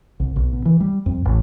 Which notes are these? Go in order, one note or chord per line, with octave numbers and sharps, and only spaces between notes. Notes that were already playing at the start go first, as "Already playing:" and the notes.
C2
B1
B2
E3
G3
F2
A1